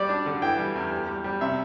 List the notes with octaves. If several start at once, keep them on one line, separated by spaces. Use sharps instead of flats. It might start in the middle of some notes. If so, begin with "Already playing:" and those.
Already playing: G3 D5
D4
D3
E3 G5
G3
E2
G3
G3
G3
C3 E5